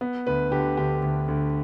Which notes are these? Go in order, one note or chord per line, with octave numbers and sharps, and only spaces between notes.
B3
D2 B4
D3 G4
D2 G4
D2
D2